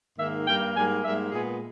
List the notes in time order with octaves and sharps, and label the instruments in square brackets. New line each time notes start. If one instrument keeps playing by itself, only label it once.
[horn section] G#2 D#3 A#3 E5
G2 G3 A#3 G5
G#2 G3 A#3 G#5
G#2 G3 A#3 E5
A#2 G#3 B3 G#4